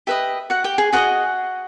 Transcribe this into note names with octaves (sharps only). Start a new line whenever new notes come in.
G4 B4 D#5 E5
F#4 F#5
G4 G5
G#4 G#5
F#4 G#4 C5 D#5 F#5